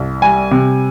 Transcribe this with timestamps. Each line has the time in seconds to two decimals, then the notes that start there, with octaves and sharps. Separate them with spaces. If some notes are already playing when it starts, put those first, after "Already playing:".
Already playing: C2
0.22 G3 G#5
0.51 C3